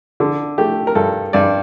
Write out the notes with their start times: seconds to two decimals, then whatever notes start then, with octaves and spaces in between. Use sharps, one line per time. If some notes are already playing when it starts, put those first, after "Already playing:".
0.20 D3
0.58 A3 G4
0.87 A#4
0.95 G2 A4
1.33 G2 D5